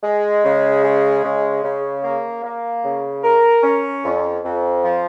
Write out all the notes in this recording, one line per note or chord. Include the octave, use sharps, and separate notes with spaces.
G#3
C#3
G#3
C#3
C#3
A#3
A#3
C#3
A#4
C#4
F2
F2
F3